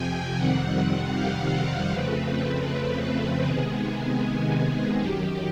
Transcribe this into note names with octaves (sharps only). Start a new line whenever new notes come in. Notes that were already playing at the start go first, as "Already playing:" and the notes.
Already playing: F2 C3 F3 G5 G#5
F2 C3 D#3 G3 C4 F#5
F#5
F5
F2 C#3 F3 A3 C4 B4
B4
C3 D#3 G#3 B3 G#4
F#2 D#3 F#3 G4